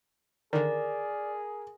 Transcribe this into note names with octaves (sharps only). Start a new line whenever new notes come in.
D3 D#3 G#4 A#4 D5